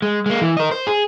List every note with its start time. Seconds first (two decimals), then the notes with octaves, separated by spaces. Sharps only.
0.02 G#3
0.26 G#3 A#3
0.41 E3
0.57 A#4 D#5
0.71 C5
0.87 G#4